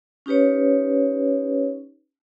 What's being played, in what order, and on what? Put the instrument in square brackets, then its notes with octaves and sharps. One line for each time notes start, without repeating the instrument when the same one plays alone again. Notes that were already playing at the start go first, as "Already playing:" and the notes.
[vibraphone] C#4 D#4 G4 B4 C#5